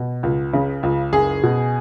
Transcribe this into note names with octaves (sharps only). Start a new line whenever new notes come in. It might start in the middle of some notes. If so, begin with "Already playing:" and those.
Already playing: B2
C#2
C#3
C#2
F#1 G#4
B2